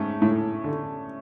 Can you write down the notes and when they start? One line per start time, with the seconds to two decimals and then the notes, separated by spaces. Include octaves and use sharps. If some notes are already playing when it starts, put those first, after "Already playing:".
Already playing: G#2 A3 C#4
0.22 A2
0.64 D3